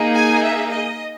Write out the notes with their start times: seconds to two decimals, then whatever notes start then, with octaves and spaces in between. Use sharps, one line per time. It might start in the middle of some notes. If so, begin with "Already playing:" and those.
Already playing: A#3 D#4 G#4
0.14 G#5
0.43 E5
0.71 D#5